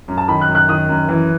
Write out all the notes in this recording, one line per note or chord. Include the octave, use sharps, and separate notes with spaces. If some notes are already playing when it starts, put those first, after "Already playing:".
F#2
A5
D#3 B5
F#6
F#2
F#6
D#3 D#6
F#2
E3